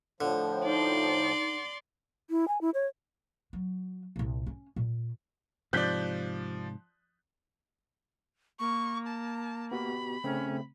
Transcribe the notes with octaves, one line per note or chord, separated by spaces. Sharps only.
A2 D3 F3
D#4 D5 C6
E4
G#5
E4
C#5
F#3
C2 A#2
C#4
A#2
G#2 C3 F3 D5 F#6 G6 B6
A#3 C#6
A5
B3 F#4 G4 B5
C#3 A3 C4 C#4